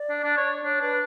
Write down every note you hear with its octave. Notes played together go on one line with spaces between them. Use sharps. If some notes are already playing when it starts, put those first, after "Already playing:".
Already playing: D5
D4
D4
C#5
D4 C#5
D4 B4